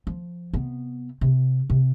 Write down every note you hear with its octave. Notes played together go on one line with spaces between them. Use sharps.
F3
C3 B3
C3
C3